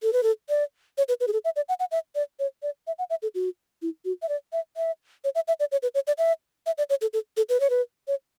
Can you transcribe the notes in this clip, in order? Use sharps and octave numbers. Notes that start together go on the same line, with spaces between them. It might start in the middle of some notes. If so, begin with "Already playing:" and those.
A4
B4
A4
D5
C#5
B4
B4
G#4
A4
E5
D5
F#5
F#5
E5
D5
C#5
D5
E5
F#5
E5
A4
F#4
E4
F#4
E5
D5
E5
E5
C#5
E5
E5
D5
C#5
B4
C#5
D5
E5
E5
D5
C#5
A4
A4
A4
B4
C#5
B4
C#5